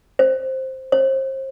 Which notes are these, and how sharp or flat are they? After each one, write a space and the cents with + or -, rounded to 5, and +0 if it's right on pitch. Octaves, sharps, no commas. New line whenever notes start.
C5 +5
C5 +35